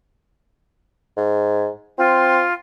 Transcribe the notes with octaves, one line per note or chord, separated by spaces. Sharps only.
G#2
C4 F4